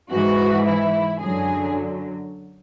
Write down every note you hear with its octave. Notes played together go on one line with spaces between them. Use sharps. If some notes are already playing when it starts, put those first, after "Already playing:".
G#2 E3 F#4
E4
F#2 D3 F#3 G#4